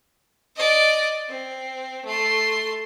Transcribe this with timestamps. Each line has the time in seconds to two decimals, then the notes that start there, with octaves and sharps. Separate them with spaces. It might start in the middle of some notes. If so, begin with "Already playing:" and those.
0.56 D5 D#5
1.29 C4
2.05 A3 C6